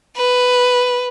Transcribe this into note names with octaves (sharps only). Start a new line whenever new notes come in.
B4